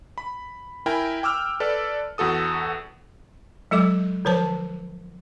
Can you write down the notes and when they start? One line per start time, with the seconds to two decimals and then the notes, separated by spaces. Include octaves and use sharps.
0.18 B5
0.86 E4 A#4 G5 G#5 B5
1.23 G5 D6 E6 F6
1.60 A4 B4 D5
2.18 E2 F#4 A4 D#6
3.71 F#3 G#3 A4 D6
4.25 D3 F3 B4 C5 A5